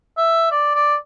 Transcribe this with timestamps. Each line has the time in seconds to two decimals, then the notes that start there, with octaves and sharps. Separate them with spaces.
0.17 E5
0.51 D5
0.74 D5